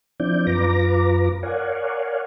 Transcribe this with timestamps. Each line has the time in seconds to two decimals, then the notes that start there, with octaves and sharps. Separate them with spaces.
0.20 F3 C4 D4 E4 D5 G6
0.47 F#2 F4 B4 A#5 D6 A#6
1.43 A#4 C#5 D5 F5 F#5 G#5